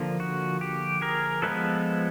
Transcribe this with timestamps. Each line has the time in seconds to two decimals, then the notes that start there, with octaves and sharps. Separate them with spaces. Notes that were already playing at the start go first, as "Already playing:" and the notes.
Already playing: D3 F3 A#3
0.20 F#4
0.61 G4
1.02 G#4 A#4
1.42 F3 G#3 B3 A4 B4